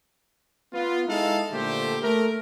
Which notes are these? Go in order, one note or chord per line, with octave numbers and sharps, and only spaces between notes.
B3 F4
G#3 D#4 E4 A4 F5
A#2 D3 A3 G4 C5
A3 A#4